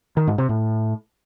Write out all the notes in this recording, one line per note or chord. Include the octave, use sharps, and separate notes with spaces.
D#3
G#2
C3
A2